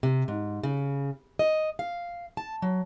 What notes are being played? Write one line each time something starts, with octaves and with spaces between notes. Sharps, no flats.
C3
G#2
C#3
D#5
F5
A5
F#3